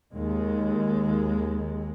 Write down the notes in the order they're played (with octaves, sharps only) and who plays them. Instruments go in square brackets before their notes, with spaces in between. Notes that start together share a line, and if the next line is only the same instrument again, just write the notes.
[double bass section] D#2 G#3